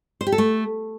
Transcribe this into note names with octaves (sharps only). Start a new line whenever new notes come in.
C5
G4
A4
A3